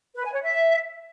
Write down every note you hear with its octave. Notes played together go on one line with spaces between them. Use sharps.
B4
G#5
C#5
E5